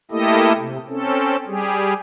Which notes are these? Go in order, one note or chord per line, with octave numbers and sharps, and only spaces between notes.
A3 A#3 E4 G4 A4 D#5
C3
C4 C#4 A4
G3 G4 G#4